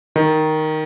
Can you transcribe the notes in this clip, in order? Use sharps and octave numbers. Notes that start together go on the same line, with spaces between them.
D#3